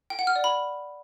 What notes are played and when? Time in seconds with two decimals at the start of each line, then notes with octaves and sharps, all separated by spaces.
0.10 G5
0.19 F#5
0.27 F6
0.36 D5
0.44 B5